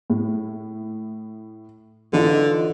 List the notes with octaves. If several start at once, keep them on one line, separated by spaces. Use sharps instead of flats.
A2
D3 E3 D#4 F4